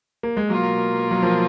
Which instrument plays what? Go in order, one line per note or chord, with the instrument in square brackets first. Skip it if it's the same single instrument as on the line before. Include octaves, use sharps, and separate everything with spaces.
[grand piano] A#3
G#3
[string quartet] B2 A#3 F4 A#4 [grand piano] F#3
[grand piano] F#3
F3